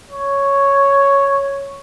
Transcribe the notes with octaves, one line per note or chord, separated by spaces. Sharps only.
C#5